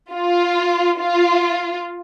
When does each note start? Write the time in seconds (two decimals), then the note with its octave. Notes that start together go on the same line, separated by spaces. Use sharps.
0.13 F4
1.00 F4